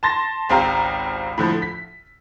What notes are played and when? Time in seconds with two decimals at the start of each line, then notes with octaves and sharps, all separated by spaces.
0.03 A5 C6 A6 A#6
0.49 G#1 C#2 C4 G4 F5 A#5
1.38 A2 D3 F3
1.62 B6